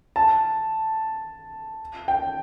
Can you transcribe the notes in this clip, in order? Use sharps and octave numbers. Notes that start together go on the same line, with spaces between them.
A5
G5